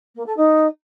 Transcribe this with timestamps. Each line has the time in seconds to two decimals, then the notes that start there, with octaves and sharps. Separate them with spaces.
0.16 A#3
0.26 A4
0.37 D#4